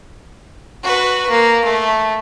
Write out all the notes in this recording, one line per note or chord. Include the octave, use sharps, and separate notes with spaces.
F#4 B4
A#3
A3